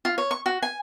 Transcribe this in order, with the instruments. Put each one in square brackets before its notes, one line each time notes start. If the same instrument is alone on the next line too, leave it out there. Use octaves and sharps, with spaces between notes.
[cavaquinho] F4
C#5
C#6
F#4
G#5